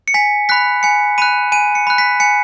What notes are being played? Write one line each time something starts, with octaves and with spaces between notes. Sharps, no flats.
C#7
G#5 B6
B5 F#6 B6
G#5 C#7
B5 F#6 D#7
G#5 D#7
C#7
B5 F#6
B6
G#5 C#7